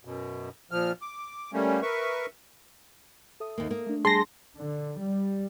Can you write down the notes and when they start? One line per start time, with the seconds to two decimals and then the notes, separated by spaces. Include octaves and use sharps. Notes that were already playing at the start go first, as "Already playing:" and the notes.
0.05 F#2 B2
0.71 A#2 F3 F6
1.02 D6
1.53 G3 A3 A#3 C#4
1.82 A#4 B4 E5 C#6
3.40 A4 E5 D#6
3.58 D#2 A#3
3.71 A#3
3.86 A3 D4
4.05 G3 G#4 A5 C6 A#6
4.56 D3
4.98 G3